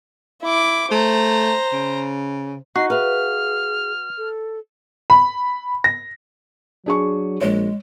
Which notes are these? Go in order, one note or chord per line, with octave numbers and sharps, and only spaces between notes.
E4 D6
A3 C5 A#5
C#3
D#4 F#4 D#5 C7
G#4 B4 E5 F5 F6
A4
B5
A#6
F#3 D4 G#4 C#6
A#1 G#3 C#5